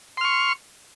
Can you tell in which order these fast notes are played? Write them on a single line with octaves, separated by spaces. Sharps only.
C6 F6 C#6